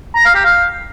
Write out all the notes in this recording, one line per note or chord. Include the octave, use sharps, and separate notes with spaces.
A#5
F5
G4
F5